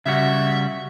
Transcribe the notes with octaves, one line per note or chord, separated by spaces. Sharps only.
C#3 G3 F#4 E5